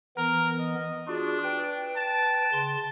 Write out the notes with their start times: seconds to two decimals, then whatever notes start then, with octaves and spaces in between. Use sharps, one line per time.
0.17 E3 B3 A#4
0.59 D#5
1.08 D4 F4 F#4 G#4
1.43 B4 G5
1.97 A5
2.53 C#3 C6